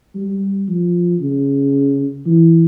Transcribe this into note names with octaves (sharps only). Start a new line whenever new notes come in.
G3
F3
C#3
E3